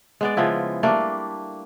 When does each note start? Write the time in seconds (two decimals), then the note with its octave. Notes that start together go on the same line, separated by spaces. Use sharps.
0.21 G#3 B3 D5
0.37 C#3 F3 B3 E4
0.83 G3 A3 A#3 D4